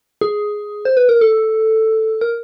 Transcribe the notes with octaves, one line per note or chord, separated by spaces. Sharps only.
G#4
C5
B4
A#4
A4
A#4